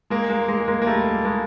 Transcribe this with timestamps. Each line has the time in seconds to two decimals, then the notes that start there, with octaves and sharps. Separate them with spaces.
0.10 G#3 A#3
0.29 G#3 A#3
0.48 G#3 A#3
0.68 G#3 A#3
0.82 A#3
0.87 G3 A3
1.25 G#3 A#3